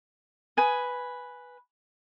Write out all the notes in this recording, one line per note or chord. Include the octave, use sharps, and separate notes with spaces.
B4 G#5 D#6